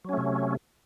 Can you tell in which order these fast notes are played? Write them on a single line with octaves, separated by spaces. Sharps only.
F#3 C#4 A3 C3